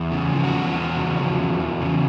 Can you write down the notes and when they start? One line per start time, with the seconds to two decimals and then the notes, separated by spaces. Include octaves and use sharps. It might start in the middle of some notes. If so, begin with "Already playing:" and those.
Already playing: E2
0.12 C#3
0.33 F3
0.43 F#4
0.54 E2
0.75 E2
0.96 C#3
1.17 F3
1.39 E2
1.59 E2
1.81 C#3